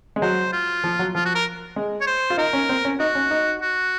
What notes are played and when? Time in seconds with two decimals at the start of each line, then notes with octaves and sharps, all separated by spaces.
0.16 G#3
0.22 F#3 C5
0.53 F4
0.84 F3
0.99 F#3
1.15 F3 F4
1.25 F#4
1.35 A#4
1.76 G#3
2.01 C#5
2.07 C5
2.30 F4
2.37 D#4 A#4
2.53 C#4
2.69 C4
2.85 C#4
3.00 D#4 F#4
3.15 C#4
3.31 D#4
3.61 F#4